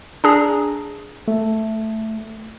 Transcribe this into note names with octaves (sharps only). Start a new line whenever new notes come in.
D4 G#4 A#5
A3